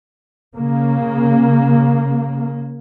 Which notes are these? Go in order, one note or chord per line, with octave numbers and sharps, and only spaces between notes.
C#3 A#3